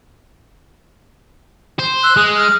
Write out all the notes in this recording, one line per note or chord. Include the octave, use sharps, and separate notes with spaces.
C5
E6 F#6
G#3 D#6
F6